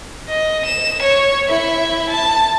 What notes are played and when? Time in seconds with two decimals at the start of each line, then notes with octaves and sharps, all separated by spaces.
0.28 D#5
0.65 E7
1.02 C#5
1.48 E4 E5
2.09 A5